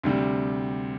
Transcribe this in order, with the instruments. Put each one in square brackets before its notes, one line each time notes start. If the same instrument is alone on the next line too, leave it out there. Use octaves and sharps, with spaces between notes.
[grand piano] D2 C3 G3